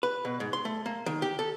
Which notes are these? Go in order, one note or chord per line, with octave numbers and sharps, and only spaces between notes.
B4
B2
G#2
C6
A3
A#3
D#3
G4
A4